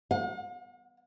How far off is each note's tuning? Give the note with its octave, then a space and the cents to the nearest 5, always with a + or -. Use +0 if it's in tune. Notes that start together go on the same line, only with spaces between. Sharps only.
F5 +45